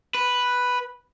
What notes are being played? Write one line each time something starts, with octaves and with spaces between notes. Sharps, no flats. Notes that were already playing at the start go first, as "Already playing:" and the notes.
B4